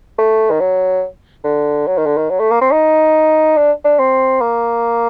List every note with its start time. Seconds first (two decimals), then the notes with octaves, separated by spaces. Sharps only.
0.18 A3
0.50 D#3
0.60 F#3
1.44 D3
1.87 F#3
1.97 D#3
2.06 D3
2.17 D#3
2.30 F#3
2.40 A3
2.51 A#3
2.61 C4
2.72 D#4
3.57 D4
3.84 D4
3.99 C4
4.40 A#3